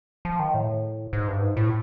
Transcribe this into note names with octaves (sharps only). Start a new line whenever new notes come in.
F3
D#3
A2
G#2
G2
G#2
A2